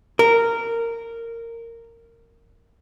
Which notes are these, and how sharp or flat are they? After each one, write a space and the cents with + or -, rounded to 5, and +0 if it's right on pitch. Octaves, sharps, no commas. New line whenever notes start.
A#4 -15